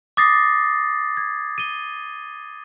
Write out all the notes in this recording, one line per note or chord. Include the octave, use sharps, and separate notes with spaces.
D6 D#6 A6 A#6 C7
G#6
D#7 G7